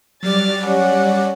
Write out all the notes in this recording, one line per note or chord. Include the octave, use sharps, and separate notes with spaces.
F#3 G3 D5 F6 A6
C#4 F#5